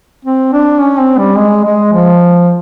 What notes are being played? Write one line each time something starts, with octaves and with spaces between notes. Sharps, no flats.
C4
D4
C#4
C4
G3
G#3
G#3
F3